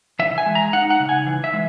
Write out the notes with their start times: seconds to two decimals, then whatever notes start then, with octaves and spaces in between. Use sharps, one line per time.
0.19 E3 E5
0.38 G#5
0.46 G#3
0.55 A#5
0.73 D#4 F#5
0.90 F#5
1.00 C#3
1.09 G#5
1.26 E3
1.44 E5
1.53 G#3